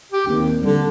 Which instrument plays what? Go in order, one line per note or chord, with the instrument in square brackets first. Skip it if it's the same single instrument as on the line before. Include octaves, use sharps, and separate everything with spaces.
[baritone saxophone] G4
[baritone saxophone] D#2 [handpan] A#3 C4 D4
[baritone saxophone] D3 [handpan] G3